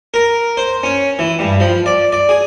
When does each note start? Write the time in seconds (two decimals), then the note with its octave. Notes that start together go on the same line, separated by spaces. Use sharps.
0.14 A#4
0.57 C5
0.83 C#4
1.19 E3
1.39 G2
1.60 F3
1.86 D5
2.13 D5
2.29 G#4